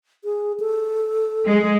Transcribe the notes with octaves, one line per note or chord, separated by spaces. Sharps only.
G#4
A4
G#3